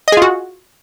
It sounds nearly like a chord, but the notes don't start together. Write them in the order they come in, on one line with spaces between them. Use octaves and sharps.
D#5 G#4 F4 F#4